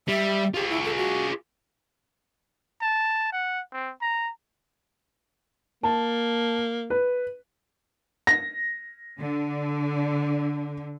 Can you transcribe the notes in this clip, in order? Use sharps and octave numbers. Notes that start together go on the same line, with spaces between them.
G3 E5
F4 G4 G#4
E4
A4
F#4
A5
F#5
C4
A#5
A#3 A5
B4
A#6
D3